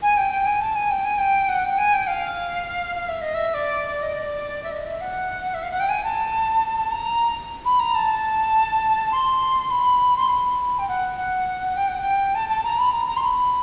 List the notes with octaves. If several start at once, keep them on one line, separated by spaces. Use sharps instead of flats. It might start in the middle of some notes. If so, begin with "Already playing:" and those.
G#5
G5
G5
G#5
A5
G#5
G5
G#5
G5
F#5
G5
G#5
G5
F5
F5
E5
D#5
E5
D5
D#5
D5
E5
D#5
E5
F#5
E5
F5
F#5
G5
G#5
A5
A5
A#5
B5
A#5
A5
C6
B5
C6
B5
G5
F#5
F#5
G5
F#5
G5
A5
A5
A#5
B5
A#5
A#5
C6
B5